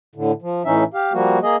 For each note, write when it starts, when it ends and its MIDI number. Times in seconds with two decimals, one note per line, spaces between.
0.15 0.32 45
0.15 0.32 50
0.42 0.63 53
0.65 0.84 45
0.65 0.84 52
0.65 0.84 61
0.65 0.84 63
0.65 0.84 76
0.94 1.13 67
0.94 1.13 77
1.13 1.39 53
1.13 1.39 55
1.13 1.39 58
1.13 1.39 66
1.43 1.56 58
1.43 1.56 68
1.43 1.56 75